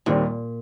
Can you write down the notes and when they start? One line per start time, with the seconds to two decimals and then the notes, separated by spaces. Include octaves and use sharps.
0.06 D#2 A#2 D#3 G3 C4